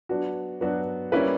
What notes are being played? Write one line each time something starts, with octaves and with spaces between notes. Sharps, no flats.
F#3 B3 D4 F#4
F#3 B3 D4 F#4
G3 A#3 C#4 E4 B4